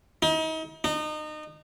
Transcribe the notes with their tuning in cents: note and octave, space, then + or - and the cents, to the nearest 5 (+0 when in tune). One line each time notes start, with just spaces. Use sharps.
D#4 +35
D#4 -30